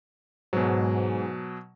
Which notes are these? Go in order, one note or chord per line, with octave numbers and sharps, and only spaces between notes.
G#2 B2 F#3